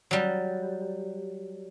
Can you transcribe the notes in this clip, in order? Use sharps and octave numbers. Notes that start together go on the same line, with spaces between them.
F#3 G3